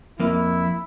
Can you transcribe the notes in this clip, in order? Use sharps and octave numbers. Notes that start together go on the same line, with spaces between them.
F2 A#3 E4